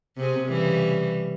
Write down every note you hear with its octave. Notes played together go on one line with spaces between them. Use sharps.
C3 C4 G#4
C#3 E3 G3